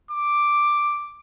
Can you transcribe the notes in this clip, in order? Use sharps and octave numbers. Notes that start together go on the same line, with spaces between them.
D6